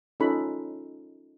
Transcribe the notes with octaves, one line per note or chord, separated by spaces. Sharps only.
C#4 D#4 F4 A4 B5